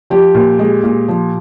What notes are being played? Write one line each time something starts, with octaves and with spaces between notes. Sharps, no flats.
F3 G4
A#2
G#3
A#2
F3